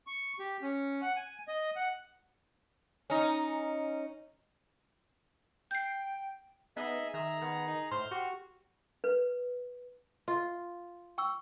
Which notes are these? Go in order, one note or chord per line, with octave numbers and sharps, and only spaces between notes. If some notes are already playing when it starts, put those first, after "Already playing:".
C#6
G4
C#4
F#5
G#5
D#5
F#5
C#4 D#4
G5 G6 C7
B3 D#4 G#4 D#5 E5
D#3 G#4 E5 A#5
D#3 B3
D#4
A2 C5 C6 F6
F#4 G4
B4
F4
G5 C#6 E6